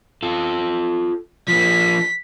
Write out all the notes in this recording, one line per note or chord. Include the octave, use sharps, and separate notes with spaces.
F4 A4
F3 A#3 B6